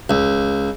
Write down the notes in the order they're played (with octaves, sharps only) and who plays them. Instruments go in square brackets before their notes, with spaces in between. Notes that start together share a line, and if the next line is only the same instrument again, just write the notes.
[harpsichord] C#2